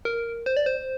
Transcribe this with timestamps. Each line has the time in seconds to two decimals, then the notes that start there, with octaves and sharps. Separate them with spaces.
0.05 A#4
0.46 C5
0.57 D5
0.66 C5